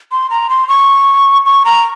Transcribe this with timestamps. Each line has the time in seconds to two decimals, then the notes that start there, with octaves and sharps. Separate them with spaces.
0.12 C6
0.30 A#5
0.50 C6
0.69 C#6
1.46 C#6
1.65 A#5